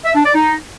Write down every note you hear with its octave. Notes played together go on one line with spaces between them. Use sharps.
E5
D4
D5
D#4